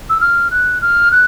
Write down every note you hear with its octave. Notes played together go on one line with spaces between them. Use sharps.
E6
F6
F#6
F6
F#6